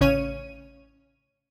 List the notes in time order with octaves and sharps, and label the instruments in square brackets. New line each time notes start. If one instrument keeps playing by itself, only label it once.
[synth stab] A1 C#3 C#4 C#5 D#7